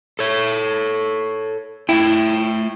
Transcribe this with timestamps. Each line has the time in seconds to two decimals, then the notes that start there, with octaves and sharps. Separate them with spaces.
0.19 A4 C#5
1.89 A3 E4 E5 G5